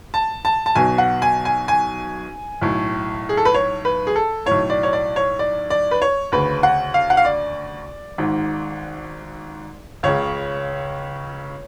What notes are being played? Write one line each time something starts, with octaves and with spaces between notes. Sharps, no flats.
A5
A5
A5
B1 B2 G#5
F#5
G#5
G#5
G#5
B1 A2
G#4
A4
B4
C#5
B4
G#4
A4
B1 A2 C#5
D5
C#5
D5
C#5
D5
D5
B4
C#5
D2 C#3 B4
F#5
F5
F#5
F5
D5
G#1 G#2
C#2 C#3 C#5